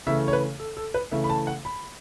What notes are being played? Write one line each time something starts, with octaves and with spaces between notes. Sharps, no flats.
C#3 E3 A3 E5
C#5
B4
A4
A4
B4
C#3 E3 A3 E5
B5
A5
F#5
B5